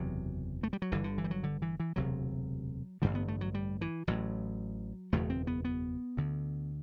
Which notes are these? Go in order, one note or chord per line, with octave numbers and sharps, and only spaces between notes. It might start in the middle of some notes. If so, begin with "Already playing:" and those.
Already playing: F#1 E2 C3 F#3
A3
G3
F#3
G1 G2 D3 E3
D3
E3
G3
F#3
D3
E3
E3
E1 D2 C3 F#3
A1 G2 D3 G3
B3
A3
F#3
G3
E3
A1 A2 F#3
F#1 E2 B2 A3
C4
B3
B3
D2 D3